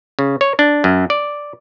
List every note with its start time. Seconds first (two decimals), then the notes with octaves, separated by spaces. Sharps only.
0.19 C#3
0.41 C#5
0.59 D4
0.84 F#2
1.10 D5